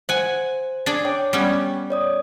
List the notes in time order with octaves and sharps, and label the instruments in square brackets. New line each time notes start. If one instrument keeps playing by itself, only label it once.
[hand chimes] C5 [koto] F#5 G#5
[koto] D4 G#4 D5
[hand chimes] C#5 G5 D6
[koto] G3 B3 C#4
[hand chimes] C#5 D5 D#6